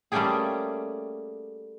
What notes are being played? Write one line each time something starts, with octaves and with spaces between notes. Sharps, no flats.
G3 A3 A#3 C#4 G4 G#4